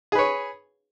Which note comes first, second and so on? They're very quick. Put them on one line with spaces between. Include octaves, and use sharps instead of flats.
G#4 B4 C#5